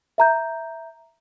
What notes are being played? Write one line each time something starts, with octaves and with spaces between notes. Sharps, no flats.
E5 A#5 G6